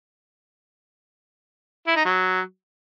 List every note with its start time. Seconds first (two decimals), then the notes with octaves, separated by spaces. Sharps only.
1.87 E4
1.96 D#4
2.05 F#3